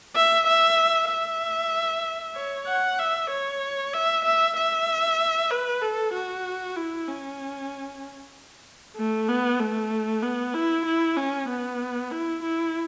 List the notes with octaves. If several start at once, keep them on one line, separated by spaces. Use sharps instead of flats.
E5
E5
E5
C#5
F#5
E5
C#5
E5
E5
E5
B4
A4
F#4
E4
C#4
A3
B3
A3
B3
E4
E4
C#4
B3
E4
E4